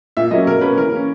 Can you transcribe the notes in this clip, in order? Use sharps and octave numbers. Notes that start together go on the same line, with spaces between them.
A#2 E5
F#3 A#3 C#4 D#5
B2 A#4
A#3 C#4 B4
E3 A#4
A#3 C#4